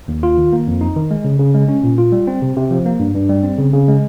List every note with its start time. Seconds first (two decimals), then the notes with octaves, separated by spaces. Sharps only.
0.08 D#2
0.23 F4
0.38 D#3
0.53 A#3
0.67 F2
0.81 D#4
0.96 D#3
1.11 G#3
1.25 C#3
1.39 C#3
1.54 G#3
1.68 C#4
1.83 A#2
1.98 F4
2.12 G3
2.27 C4
2.42 C3
2.56 C3
2.71 F3
2.86 A#3
2.99 G2
3.15 G2
3.29 G3
3.43 C4
3.58 C#3
3.73 C#3
3.88 G#3